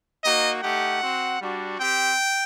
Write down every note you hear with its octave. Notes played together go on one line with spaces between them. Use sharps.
A#3 D#4 F#4 D#5
A3 D#4 G4 F#5
C4 F#4
G3 D4 F#4
C4 G4 G5